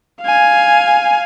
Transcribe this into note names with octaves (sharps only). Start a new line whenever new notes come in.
F5 G#5